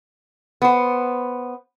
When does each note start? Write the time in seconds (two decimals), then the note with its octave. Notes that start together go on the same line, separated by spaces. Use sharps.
0.62 B3 C5